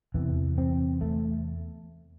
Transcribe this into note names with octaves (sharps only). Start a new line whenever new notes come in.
E2 C3 E3
C4
A3